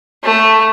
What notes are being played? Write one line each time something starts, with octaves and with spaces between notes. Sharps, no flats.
A3